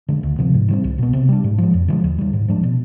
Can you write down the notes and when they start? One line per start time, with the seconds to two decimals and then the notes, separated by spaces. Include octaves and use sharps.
0.09 D3 G#3
0.23 D2
0.39 C3 F3
0.54 G#2
0.68 D#3 G3 C4
0.84 C2
0.98 B2 B3
1.13 C3
1.29 G3 D4
1.44 G#2
1.58 F3 G#3
1.74 F2
1.88 D3 F3 G#3
2.04 D#2
2.18 D#3 G3
2.33 G#2
2.48 F3 G#3 D4
2.63 B2